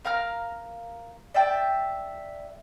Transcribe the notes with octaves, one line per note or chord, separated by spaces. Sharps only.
A#4 F5 A#5 F6
D5 E5 G5 A5